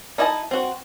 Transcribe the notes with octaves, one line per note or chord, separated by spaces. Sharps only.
D#4 E4 D#5 G#5 A5
C4 F#4